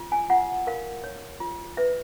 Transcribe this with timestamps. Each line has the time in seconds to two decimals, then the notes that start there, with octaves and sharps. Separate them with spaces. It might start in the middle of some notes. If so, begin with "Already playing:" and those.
Already playing: F4
0.12 G#5
0.30 F4 F#5
0.67 A#4 F5
1.04 C#5
1.40 F4
1.77 B4 E5